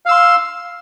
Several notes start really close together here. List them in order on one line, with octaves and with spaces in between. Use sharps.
F5 E6 C6